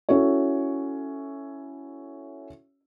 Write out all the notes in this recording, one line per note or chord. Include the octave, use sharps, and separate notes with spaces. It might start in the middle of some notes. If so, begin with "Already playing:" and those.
C#4 E4 F#4 A4 C#5